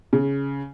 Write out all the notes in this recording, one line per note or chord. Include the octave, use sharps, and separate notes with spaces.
C#3